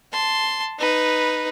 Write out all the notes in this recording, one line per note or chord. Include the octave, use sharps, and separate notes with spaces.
A5 C6
D#4 B4